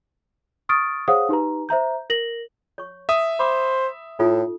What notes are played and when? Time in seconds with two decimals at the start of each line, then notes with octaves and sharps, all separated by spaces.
0.69 C#6 D#6 F6 A6 D7
1.08 G#4 C5 C#5 F5 F#5 D#6
1.29 D#4 G4 B4 A#5
1.69 C5 E5 A#5 G6
2.10 A#4 A#6 F#7
2.78 C#5 C#6
3.09 E5 D#6
3.39 C5 B5 D6 E6
4.19 A2 D#4 F4 A4